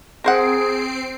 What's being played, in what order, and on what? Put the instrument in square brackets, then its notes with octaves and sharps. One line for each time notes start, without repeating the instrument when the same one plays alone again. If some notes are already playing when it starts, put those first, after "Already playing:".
[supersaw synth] C4 C7 D7 [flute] G#4 [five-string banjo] A#4 C5 F#5